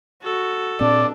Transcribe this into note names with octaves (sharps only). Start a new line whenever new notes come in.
F#4 A4
A#2 C4 D4 D5